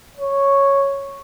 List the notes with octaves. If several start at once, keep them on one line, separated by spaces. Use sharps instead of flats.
C#5